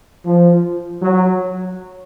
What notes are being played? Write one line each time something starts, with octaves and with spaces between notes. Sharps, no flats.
F3
F#3